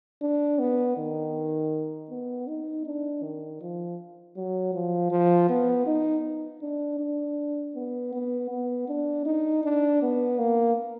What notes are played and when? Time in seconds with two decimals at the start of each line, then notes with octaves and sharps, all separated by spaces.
0.22 D4
0.59 B3
0.97 D#3
2.10 B3
2.47 D#4
2.86 D4
3.23 D#3
3.61 F3
4.36 F#3
4.74 F3
5.11 F3
5.49 B3
5.87 D#4
6.62 D4
6.99 D4
7.75 B3
8.13 B3
8.50 B3
8.88 D4
9.26 D#4
9.64 D4
10.02 B3
10.39 A#3